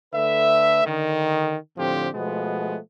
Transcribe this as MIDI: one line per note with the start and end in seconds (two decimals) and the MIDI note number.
0.13 0.82 50
0.13 0.82 57
0.13 0.82 71
0.13 0.82 76
0.86 1.56 50
0.86 1.56 51
1.77 2.08 45
1.77 2.08 50
1.77 2.08 53
1.77 2.08 60
1.77 2.08 65
1.77 2.08 67
2.14 2.78 47
2.14 2.78 53
2.14 2.78 56
2.14 2.78 57
2.14 2.78 59